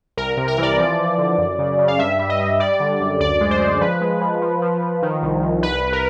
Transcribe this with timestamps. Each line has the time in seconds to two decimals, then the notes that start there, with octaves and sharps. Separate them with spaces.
0.17 C2 A#4
0.33 C3 A#4
0.48 A#4
0.58 E3 D5
0.78 F3
0.98 F3
1.18 D3
1.38 F#2
1.59 C#3
1.79 C#3
1.88 F5
1.99 G2 E5
2.19 G3
2.29 D#5
2.39 G3
2.60 G3 D5
2.80 D3
3.00 F#2
3.20 D2 D5
3.41 G#3
3.51 C5
3.61 G#3
3.81 F3 B4
4.01 G#3
4.21 F3
4.42 F3
4.62 F3
4.82 F3
5.02 D#3
5.22 C2
5.43 C2
5.63 C2 B4
5.83 C2
5.93 A#4